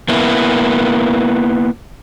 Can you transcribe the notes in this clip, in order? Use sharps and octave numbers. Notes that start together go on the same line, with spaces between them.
A#3 B3 E4